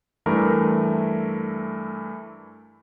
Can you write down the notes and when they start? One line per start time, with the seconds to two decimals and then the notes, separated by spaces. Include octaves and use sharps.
0.26 G2 E3 A3 A#4